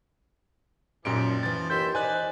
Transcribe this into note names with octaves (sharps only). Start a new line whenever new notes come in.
F#2 A#2 F3 D#4 G4 D7
E3 C#4 A6
D#2 E5 C6 G6
D#4 C5 D5 G#5 F#6